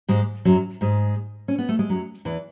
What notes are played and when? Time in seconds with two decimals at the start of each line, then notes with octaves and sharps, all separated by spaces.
0.08 G#2 G#3
0.45 F#2 F#3
0.81 G#2 G#3
1.48 C#4
1.58 B3
1.69 A3
1.79 G#3
1.89 F#2 F#3
2.25 E2 E3